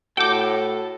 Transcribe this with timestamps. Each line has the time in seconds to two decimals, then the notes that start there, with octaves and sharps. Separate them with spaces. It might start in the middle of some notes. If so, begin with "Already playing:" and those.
0.17 A2 F#4 A4 G5 D6